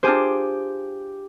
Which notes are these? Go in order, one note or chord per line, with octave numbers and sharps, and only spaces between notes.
D4 F4 G4 G#4 C5